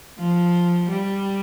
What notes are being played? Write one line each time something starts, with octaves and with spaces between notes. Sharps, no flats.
F3
G3